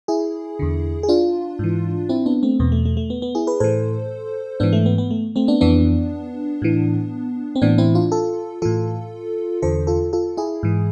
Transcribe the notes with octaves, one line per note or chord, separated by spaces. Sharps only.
E4 G#4
E2 D3
G#4
D4 F4
G#2 E3
C4 E4
B3 D4
A3 C4
E2 B2 B3
A3
A3
A3
B3
B3
E4 G#4
G#4 B4
A2 E3 A4 C5
G#2 E3 B3 D4
A3
B3
B3
A3
A3 C4
B3 D4
F2 E3 B3 D4
A2 E3
C4
A2 E3 B3 D4
C4 E4
D4 F4
F4 A4
A2 E3 F4 A4
E2 D3 A4 C5
F4 A4
F4 A4
E4 G#4
G#2 E3